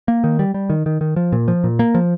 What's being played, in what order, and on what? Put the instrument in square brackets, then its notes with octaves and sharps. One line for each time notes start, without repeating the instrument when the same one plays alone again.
[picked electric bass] A#3
D#3
G3
G3
D#3
D#3
D#3
F3
A#2
F3
A#2
A#3
F3